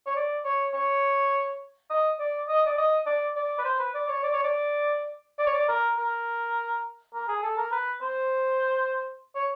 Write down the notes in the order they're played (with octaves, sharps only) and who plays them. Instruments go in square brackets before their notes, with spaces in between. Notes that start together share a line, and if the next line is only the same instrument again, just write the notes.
[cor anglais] C#5
D5
C#5
C#5
D#5
D5
D#5
D5
D#5
D5
D5
B4
C5
B4
D5
C#5
D5
C#5
D5
D5
C#5
D5
A#4
A#4
A#4
G#4
A4
A#4
B4
C5
C#5